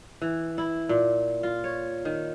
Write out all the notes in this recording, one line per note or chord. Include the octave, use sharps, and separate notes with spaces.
E3
E4
A#2
F4
C#5
D#3